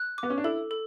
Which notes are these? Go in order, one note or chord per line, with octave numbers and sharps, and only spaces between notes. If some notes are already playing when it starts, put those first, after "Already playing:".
Already playing: F#6
B3 D6
C#4
D4
E4 A4
A4